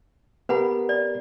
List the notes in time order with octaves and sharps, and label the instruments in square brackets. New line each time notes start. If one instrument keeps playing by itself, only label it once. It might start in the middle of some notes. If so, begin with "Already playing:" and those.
[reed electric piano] B3 G4 A#4 [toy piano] B4 F#5 B5
[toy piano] D5